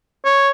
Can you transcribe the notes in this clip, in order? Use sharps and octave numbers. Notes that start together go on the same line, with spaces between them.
C#5